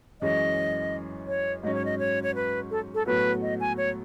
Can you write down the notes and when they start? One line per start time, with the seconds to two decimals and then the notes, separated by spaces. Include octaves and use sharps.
0.22 F#2 E3 G#3 C#4 D#5
1.28 C#5
1.63 G#2 F#3 C#4 D#5
1.74 C#5
1.85 D#5
1.99 C#5
2.23 C#5
2.35 B4
2.71 A4
2.95 A4
3.06 A2 F#3 B3 F#4 A4 B4
3.42 D#5
3.60 G#5
3.78 C#5